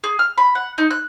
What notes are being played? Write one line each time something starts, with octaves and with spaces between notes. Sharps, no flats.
G#4
F6
B5
F#5
D#4
F#6